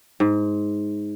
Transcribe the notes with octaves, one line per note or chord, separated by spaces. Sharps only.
G#2